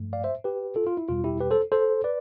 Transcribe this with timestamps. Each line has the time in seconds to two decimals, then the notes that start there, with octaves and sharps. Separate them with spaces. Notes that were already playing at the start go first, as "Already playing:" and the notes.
Already playing: G2 F3 A3
0.13 D5 F5
0.24 C5 E5
0.44 G4 B4
0.76 F4 A4
0.87 F4
0.97 E4
1.09 E2 B2 G3 F4
1.24 E4 G4
1.40 G4 B4
1.51 A4 C5
1.72 A4 C5
2.04 B4 D5